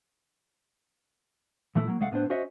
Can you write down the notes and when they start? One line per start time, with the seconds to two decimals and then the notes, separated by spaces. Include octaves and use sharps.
1.75 A#2 E3 A3 E4
1.88 F#3 A#3
2.00 C2 G#3 A3 F5 F#5
2.11 A2 B3 D4 C5
2.30 C#4 F#4 C5 C#5 D#5 E5